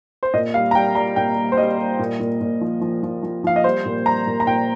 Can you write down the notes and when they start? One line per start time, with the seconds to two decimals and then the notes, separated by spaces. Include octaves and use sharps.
0.23 C5
0.34 A#2 D#5
0.54 G3 F5
0.71 A#5
0.75 G3 G5
0.95 G3 A#5
1.16 A#2 G5
1.37 G3
1.52 C5
1.58 G3 D#5
1.78 G3
1.99 A#2
2.20 A#2
2.41 A#2
2.61 F3
2.81 F3
3.03 F3
3.23 F3
3.44 F3 F5
3.56 D#5
3.64 G3 C5
3.85 A#2
4.06 G3 A#5
4.27 A#2
4.40 A#5
4.47 A#2 G5